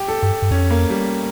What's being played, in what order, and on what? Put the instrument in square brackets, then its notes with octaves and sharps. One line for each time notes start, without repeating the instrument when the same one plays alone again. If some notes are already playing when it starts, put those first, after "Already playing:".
Already playing: [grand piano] G4
A4
[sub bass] G2 [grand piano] G4
[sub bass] G2
[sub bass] F2 [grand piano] C#4
[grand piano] A#3
G3